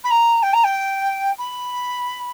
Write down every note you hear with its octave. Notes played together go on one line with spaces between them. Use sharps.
B5
A#5
G5
A#5
G5
B5